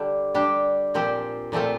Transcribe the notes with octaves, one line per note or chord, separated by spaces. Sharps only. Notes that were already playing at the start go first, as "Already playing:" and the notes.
Already playing: D3 G3 D4
G3 D4 G4
A#2 F3 C4 G4
A#2 F3 A3 C4 F4